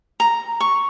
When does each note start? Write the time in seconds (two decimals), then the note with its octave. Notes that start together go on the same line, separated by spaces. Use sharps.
0.20 A#5
0.60 C#6